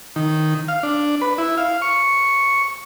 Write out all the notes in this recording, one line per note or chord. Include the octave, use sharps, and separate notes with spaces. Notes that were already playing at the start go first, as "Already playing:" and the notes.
D#3
F5
D4
B4
E4
F5
C#6